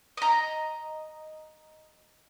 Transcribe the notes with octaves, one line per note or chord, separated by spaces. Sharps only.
D#5 A#5